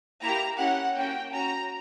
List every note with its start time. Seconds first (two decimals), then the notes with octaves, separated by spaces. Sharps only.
0.21 A#3 E4 G4 A#5
0.58 C#4 E4 G4 F#5
0.96 A#3 C#4 F#4 G5
1.32 C#4 F#4 A#5